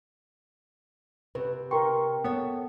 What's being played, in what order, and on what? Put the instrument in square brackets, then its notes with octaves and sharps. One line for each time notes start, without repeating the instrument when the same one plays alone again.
[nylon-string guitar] C3 [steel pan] B4
[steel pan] A#4 C6 C#6 [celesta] G5
[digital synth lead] B3 [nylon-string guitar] A4 C#5